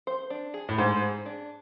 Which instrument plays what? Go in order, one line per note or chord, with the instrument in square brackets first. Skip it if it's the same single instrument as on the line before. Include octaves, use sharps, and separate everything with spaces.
[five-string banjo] C5
D4
G#4
[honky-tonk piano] A2
[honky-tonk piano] G#2 [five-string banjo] C5
[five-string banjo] G#4
D4